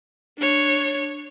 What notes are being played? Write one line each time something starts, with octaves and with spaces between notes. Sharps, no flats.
D4 C#5